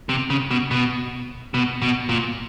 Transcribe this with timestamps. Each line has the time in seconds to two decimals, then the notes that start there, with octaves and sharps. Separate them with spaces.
0.09 C3
0.30 C#3
0.51 B2
0.71 B2
1.54 B2
1.82 B2
2.09 A#2